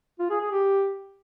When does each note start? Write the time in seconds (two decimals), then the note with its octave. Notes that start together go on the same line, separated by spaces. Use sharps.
0.19 F4
0.30 G#4
0.41 G#4
0.51 G4